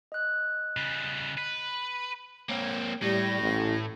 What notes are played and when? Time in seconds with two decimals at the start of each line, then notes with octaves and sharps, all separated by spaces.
0.12 D#5 F#6
0.77 C#3 G3
1.38 B4
2.49 A#3 C4 C#5
3.02 A2 G3 A#6
3.41 A1